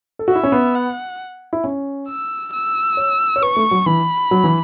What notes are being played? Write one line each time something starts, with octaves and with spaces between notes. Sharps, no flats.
A4
F#4 E5
E4
C#4
B3
F#5
E4
C#4
E6
E6
C#5
C#5
B4 C#6
A3
F#3
E3 B5
F#3
E3